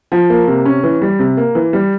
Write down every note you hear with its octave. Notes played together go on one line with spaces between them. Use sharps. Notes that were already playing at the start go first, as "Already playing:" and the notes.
F3
A#3
C3
C#4
E3
G3
C3
A#3
E3
G3